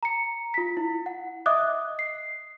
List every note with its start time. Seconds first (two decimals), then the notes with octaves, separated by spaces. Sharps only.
0.03 A#5 C#7
0.54 F4 B6
0.77 E4
1.06 F#5
1.46 D#5 E5 D6 D#6 F#6
1.99 C7